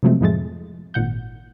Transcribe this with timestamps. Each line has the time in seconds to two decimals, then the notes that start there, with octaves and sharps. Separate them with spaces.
0.03 C3 F3 F#3 G#3 A3 C4
0.21 F2 A2 F3 G#3 A3 A6
0.94 G#1 A#2 F#5 G6